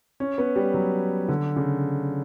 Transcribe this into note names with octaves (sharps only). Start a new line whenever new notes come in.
C#4
B3
G3
F#3
D3
C#3